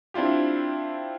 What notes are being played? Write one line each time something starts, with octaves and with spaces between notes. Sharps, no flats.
C4 D4 E4 F4 G4